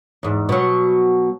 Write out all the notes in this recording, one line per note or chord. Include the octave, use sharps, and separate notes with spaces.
E2 G#2
B2 F#3